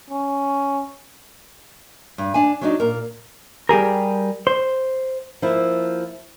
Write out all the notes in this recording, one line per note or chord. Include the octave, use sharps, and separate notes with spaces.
C#4
G2
D4 G#5
F#3 D4 D#4
A#2 A#4
G3 G4 G#4 A#4
C5
F3 A#3 E4